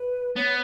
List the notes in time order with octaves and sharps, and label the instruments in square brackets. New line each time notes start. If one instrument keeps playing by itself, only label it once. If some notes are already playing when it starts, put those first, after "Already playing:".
Already playing: [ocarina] B4
[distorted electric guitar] B3 [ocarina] C#5